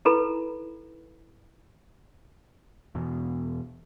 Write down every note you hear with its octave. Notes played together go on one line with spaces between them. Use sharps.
D#4 E4 A4 B4 A#5 B5
E2 B2